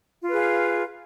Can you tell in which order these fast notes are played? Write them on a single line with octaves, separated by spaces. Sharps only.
F4 B4 G#4 F5